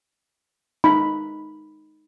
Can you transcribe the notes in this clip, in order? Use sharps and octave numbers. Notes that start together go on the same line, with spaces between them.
D#4 B5